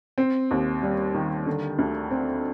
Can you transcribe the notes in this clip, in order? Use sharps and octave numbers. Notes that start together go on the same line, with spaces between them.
C4
D#2
G3
D#3
D3
D2
C4